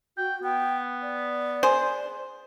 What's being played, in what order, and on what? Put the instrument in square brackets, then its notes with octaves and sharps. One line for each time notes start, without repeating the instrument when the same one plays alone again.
[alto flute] F#4 [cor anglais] G5
[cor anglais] B3 [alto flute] G5
[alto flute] D5
[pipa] G#4 C5